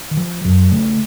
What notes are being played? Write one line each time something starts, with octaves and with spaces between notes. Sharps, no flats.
D#3
F3
F#2 F#3
C#3 A3